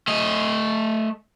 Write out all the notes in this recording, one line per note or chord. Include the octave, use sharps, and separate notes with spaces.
A3 D#5